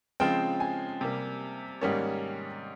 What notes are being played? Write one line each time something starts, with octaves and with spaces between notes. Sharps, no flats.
C#3 F3 G#3 C4 G5
G#5
C3 G3 A#3
G#2 D#3 G3 A#3 C#4